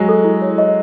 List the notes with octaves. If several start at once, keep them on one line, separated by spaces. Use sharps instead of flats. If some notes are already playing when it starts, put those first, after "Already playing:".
Already playing: F#3 G#3
A4
E4
C#5
D#5